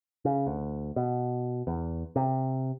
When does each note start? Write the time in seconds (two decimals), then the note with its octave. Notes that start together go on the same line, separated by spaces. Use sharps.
0.25 C#3
0.47 D2
0.96 B2
1.67 E2
2.16 C3